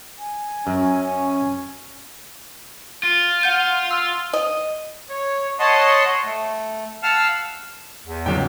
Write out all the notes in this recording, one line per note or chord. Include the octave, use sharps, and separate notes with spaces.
G#5
F#2 C#4
F4
F#5 G6 D#7
E6
D#5
C#5
C#5 D#5 F#5 A5 C6
A3
F5 F#5 A5 E6 F6
E2
C#2 G#2 F#3 G5